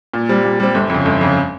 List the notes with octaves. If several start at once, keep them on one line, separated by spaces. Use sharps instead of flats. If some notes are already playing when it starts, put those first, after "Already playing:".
A#2
G3 C4
A#2
G3 C4
G1
F2 C#3
G1
F2 C#3